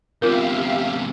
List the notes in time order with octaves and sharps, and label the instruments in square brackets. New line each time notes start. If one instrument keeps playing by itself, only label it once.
[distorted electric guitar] E2 C3 [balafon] F4 A#4 [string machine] G4 E5 F5